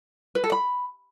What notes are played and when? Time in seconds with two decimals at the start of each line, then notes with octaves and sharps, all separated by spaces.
0.35 B4
0.44 A4
0.52 B5